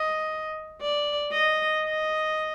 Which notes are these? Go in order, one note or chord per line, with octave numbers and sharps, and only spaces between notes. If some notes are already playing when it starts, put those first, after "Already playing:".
Already playing: D#5
D5
D#5
D#5